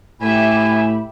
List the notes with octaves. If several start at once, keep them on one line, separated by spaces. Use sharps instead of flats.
A2 G4 E5 G#5 B5